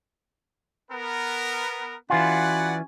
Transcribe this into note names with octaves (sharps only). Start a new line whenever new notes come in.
B3 A#4
E3 C#4 F4 F#4 B4 D5 F#5 G#5